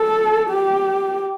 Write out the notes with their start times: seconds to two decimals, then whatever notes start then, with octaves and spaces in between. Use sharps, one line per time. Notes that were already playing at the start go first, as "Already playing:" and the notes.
Already playing: A4
0.50 G4